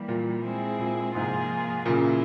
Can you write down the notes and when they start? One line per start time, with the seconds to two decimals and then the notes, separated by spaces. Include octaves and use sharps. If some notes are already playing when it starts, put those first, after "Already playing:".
Already playing: E3 G3 A#3
0.09 A#2
0.44 G#3 C4 E4 G#4
0.79 A#2
1.15 G#2 C3 F3 A#3 F4 G#4
1.86 A#2 C#3 E3 A#3 E4